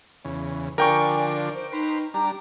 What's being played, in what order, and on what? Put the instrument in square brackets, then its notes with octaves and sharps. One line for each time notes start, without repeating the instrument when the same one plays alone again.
[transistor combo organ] E2 C#3
[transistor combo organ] D3 F3 D4 [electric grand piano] A#4 G5 C#6 [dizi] G#5
[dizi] C5
[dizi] D#4 [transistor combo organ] B4 C5
[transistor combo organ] G3 D4 [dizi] A#5